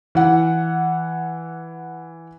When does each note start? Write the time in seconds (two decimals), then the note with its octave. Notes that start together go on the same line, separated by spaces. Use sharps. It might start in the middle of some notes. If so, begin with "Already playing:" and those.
0.15 E3 F#5